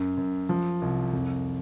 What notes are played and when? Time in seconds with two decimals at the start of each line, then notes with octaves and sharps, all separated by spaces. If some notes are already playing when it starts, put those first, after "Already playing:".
Already playing: F#2
0.17 F#2
0.49 F3
0.82 C2
1.13 F2